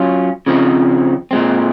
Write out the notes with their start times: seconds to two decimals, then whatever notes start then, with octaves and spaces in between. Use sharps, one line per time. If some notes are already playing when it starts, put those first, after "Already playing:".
Already playing: F#3 C#4 F4
0.46 C#3 F3 C4 D#4
1.31 A#2 G#3 C4